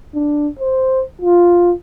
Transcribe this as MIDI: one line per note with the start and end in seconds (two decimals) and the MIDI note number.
0.14 0.48 62
0.59 1.02 72
1.21 1.72 65